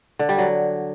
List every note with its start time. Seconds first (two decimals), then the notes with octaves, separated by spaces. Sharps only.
0.19 D3
0.29 G3
0.38 F#3